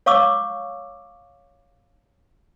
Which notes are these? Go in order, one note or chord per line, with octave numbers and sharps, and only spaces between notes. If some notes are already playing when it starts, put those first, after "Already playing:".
C#5 F5 C#6 D6 E6